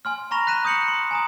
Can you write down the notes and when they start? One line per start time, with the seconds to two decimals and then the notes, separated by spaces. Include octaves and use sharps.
0.05 G#5 C6 F6
0.31 A#5 B5 C#6 A#6 F7
0.47 F#6 B6 D#7 E7
0.65 D#6 G6 C#7 F#7
0.88 C6
1.11 G#5 A#5 D#6